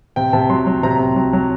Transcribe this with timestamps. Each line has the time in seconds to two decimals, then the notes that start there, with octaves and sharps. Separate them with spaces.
0.16 C3 G5
0.33 C3 A5
0.49 F#3 C6
0.67 F#3
0.83 C3 A#5
0.99 C3
1.16 F#3
1.33 F#3